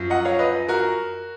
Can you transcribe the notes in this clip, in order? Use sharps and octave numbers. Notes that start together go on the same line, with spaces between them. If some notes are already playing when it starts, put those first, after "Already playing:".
Already playing: F#2 F3
D#5 F#5
C#5 F5
B4 D#5
F#4 A#4